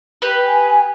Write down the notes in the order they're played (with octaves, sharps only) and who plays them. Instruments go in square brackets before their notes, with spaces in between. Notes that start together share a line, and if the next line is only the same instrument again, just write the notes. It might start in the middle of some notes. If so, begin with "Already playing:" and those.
[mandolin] G4 B4
[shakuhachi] G#5